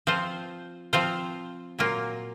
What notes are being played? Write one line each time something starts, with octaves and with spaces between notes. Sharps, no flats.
F3 C4 F4 C5
F3 C4 F4 C5
A#2 F#3 A#3 F4